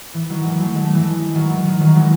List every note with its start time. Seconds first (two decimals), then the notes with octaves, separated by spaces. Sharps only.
0.14 E3
0.29 D#3 F#3
0.44 E3 G#3
0.60 F#3 A3
0.75 G#3
0.84 A3
0.93 E3 G#3
1.35 D#3 F#3
1.50 E3
1.65 D#3
1.80 D#3 F#3
1.96 E3 G#3